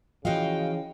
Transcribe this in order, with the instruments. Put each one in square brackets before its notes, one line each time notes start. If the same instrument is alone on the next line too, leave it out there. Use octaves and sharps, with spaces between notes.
[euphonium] C#3 [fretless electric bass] E3 F3 [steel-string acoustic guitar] F#4 D#5 F5 [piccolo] G5